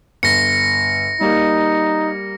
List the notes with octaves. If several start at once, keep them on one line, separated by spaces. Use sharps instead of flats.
G1 A#6 C#7
G3 A#3 D#4